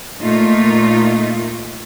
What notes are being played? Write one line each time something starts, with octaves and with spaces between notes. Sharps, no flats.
A#2 A3 D#4 F4